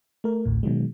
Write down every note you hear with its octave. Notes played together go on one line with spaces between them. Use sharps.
A3 A#4
A1 D2 A2
B2 D#3 F#3 G#3